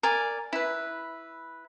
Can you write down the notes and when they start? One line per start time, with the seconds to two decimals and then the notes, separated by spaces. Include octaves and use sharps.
0.03 A#4 D5 G#5
0.53 E4 B4